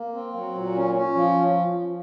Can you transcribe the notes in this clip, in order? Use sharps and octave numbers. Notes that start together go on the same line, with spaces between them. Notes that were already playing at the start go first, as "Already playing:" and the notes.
Already playing: A#3
C4
F#3
A#2
C#4
C#4
F3